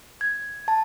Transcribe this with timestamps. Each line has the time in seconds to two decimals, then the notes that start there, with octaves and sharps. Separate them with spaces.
0.21 G#6
0.68 A5